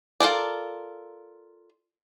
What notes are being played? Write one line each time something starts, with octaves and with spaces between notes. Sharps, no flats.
F4 A4 A#4 D5